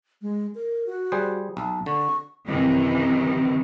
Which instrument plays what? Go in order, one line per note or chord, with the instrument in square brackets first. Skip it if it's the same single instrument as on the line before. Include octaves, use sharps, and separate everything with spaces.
[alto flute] G#3
A#4
F#4
[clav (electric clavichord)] G3 G#4 C5
[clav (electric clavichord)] B1 [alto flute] A5
[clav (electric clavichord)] D3 [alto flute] C#6
[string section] F#2 C3 D#3 E3